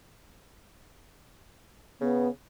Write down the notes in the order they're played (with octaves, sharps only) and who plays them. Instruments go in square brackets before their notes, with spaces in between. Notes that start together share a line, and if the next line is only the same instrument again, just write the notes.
[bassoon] C#3 [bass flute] B3